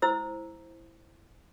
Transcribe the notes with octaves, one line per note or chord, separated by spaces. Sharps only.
E4 C5 E6